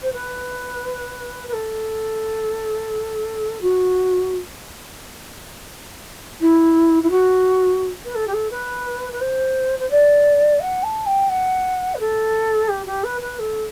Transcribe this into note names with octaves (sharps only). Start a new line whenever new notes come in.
C5
B4
B4
A4
F#4
E4
E4
F#4
B4
A4
G4
A4
B4
B4
C5
C5
D5
F#5
A5
G5
F#5
B4
A4
G4
G4
B4
B4
A4